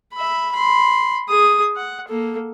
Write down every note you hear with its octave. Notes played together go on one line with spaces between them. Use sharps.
E5 B5
B5 C6
G#4 D#6
F#5
A#3 A4